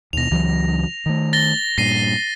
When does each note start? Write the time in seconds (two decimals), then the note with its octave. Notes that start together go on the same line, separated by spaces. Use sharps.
0.13 D#2 B2 A#6 F7
0.31 C#2 E3 F#3
1.06 D#3 A3
1.33 A6 A#6 G7
1.78 G2 A#2 A#6 C7 D#7